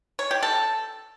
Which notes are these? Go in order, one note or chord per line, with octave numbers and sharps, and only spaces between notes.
C#5
G4
A4